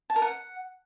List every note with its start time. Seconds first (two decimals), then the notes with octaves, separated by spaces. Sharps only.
0.10 A5
0.16 A#4
0.22 F#5